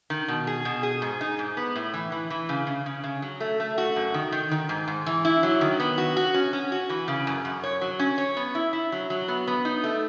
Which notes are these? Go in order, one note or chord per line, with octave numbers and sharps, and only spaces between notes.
D#3
B2
G#4
B2
G#4
G#2
D#4
G#2
B3
A2
E3
E3
E3
C#3
C#3
C#3
C#3
F#3
A3
A3
F#4
F#2
D#3
D#3
D#3
G#2
G#2
E3
E4
F#3
D#3
B3
F#4
F#4
C#4
C#4
F#4
E3
C#3
F#2
F#2
C#5
F#3
C#4
C#5
B3
E4
E4
F#3
F#3
B3
B3
D#4
A3